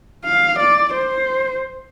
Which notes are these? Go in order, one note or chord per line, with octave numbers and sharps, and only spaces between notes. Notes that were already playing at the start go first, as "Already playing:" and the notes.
F5
D5
C5